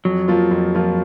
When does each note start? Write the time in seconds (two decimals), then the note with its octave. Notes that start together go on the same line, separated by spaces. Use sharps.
0.05 F2 F#3
0.28 F3 A#3 F4
0.51 F2
0.75 F3 A#3 F4